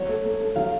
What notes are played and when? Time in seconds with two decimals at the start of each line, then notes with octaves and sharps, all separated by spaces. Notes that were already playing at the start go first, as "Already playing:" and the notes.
Already playing: F#3 C#5
0.08 A3
0.25 A3
0.40 A3
0.56 F#3 F5